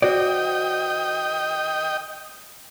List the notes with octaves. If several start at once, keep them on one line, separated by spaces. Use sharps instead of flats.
F#4 C5 D5 D#5 G5